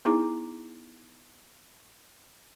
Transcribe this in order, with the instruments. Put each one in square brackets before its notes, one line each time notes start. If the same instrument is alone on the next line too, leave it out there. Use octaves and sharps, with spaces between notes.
[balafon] B3 D#4 E4 G#4 A#5 D6